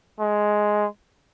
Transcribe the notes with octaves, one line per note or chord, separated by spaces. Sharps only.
G#3